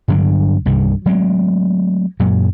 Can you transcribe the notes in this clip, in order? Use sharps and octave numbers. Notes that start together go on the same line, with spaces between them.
G2 D3 F#3 D4
C2 G2 C3 D#3
F#3 G#3 A3 C4
F#2 A#2 F#3